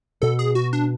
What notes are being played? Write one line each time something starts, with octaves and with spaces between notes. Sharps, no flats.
B2 A4
G#4
F#4
D4